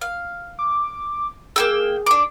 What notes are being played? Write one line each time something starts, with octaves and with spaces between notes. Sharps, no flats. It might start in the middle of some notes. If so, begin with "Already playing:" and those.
F5
D6
A#3 G#4 G5 E6
D4 D6